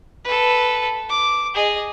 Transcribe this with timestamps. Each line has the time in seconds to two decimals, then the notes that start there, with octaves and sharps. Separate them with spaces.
0.25 A4 B4
1.10 D6
1.54 G#4 D#5